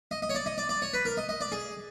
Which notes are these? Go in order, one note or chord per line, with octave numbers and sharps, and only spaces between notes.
D#5
D#5
C#5
D5
D#5
D5
D5
C#5
B4
A#4
D#5
D#5
D5
G#4